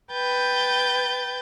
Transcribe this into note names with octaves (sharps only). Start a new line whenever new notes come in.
B4 G5 G6 A6